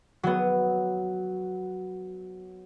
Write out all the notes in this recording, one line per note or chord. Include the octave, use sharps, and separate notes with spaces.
F#3 B3